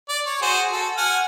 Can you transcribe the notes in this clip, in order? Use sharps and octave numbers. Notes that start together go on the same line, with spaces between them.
D5
C#5
F#4 G#4 C5
F#4 A4
F#5 G#5 F6